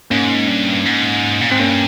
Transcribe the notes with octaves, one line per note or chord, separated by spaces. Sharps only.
G#2 A#3 C#4
G2
G#2
A#2
G#2 C4
G2 A#3 C#4